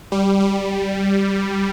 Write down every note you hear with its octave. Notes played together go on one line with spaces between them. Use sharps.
G3
G3